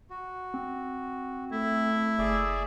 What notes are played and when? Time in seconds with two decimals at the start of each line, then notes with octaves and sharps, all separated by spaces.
0.10 F#4
0.54 C4
1.52 A3 E4
2.19 F#1 G#4 D5 E5